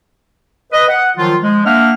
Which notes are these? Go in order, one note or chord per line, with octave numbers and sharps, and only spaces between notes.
B4 D#5
F#5
D#3 F3 F#3 F4
F3 G#3
A#3 D4 E5 F#5 F6